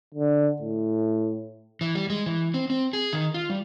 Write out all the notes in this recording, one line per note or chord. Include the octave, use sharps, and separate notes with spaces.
D3
A2
E3
G3
G#3
E3
C4
C4
G#4
D#3
F4
G3